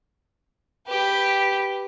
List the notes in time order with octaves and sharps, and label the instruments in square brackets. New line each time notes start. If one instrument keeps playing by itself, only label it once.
[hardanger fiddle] G4 B4